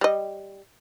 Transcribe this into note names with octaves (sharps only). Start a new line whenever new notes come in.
G3 D#5